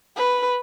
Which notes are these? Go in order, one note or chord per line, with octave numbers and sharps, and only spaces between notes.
B4